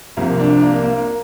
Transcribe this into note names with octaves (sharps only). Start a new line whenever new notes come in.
C2 C3 F3 A#3
D4
A#3
A#3